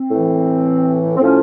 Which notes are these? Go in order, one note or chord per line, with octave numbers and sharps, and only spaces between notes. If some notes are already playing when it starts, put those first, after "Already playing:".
Already playing: C4
A2 E3
C4
A2 F3 C#4